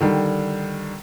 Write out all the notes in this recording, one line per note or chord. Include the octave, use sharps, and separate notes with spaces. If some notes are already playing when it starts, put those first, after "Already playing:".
D3 D#3 G3